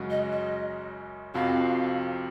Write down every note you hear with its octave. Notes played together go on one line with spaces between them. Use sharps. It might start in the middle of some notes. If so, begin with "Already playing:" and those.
Already playing: F#2 C#3 G#3 C#4 F#4
D#5
D#5
F2 C3 F3 C4 F#4 F5